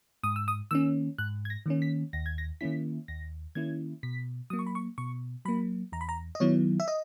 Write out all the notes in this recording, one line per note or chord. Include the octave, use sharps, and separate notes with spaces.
G#2 D#6
E6
D#6
D#3 A#3 C#4 E6
G#2 F#6
G#6
A#6
D#3 A#3 C#4
B6
D#2 A#6
G#6
A#6
D#3 A#3 C#4 E4 B6
D#2 A#6
D#3 A#3 C#4 E4 G#6
B2 B6
F#3 A#3 D#6
C#6
B5
C#6
B2 C#6
F#3 A#3 B5
E2 A#5
B5
A#5
D#5
D#3 F#3 B3 E4 C#5
E5
D#5